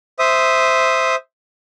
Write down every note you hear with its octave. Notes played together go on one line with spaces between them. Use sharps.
C5 E5 D#6